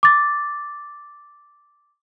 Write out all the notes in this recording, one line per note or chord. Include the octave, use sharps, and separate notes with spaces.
D6 A6